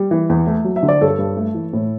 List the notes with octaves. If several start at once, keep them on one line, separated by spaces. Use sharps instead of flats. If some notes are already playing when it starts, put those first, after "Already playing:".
Already playing: G3
E3
E2
A3
F#3
E5
D3
D5
G2 A4 C#5
G2
A3
E3
A2